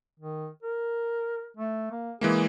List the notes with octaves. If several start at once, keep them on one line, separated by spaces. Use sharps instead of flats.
D#3
A#4
A3
A#3
E3 G#3 A#3 G#4